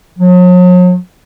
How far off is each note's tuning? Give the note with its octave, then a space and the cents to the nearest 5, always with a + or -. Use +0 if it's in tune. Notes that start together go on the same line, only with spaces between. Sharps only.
F#3 -45